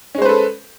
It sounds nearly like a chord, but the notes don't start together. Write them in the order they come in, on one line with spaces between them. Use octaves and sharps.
C#4 G#3 C5 B4 A4